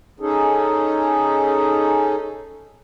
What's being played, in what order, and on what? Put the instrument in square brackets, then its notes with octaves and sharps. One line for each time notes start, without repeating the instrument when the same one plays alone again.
[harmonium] C#4 D#4 G#4 A4